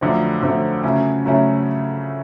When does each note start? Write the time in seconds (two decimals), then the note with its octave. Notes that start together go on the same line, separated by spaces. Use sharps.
0.01 F2 D3 F#3 A3 C4
0.42 F2 D3 F#3 A3 C4
0.84 C#3 F#3 A3 C#4 E4
1.25 C#3 F#3 A3 C#4 E4